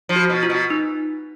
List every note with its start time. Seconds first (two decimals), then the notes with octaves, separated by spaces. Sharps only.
0.09 F3
0.16 F#4
0.30 B2
0.43 F4
0.50 B2
0.70 D#4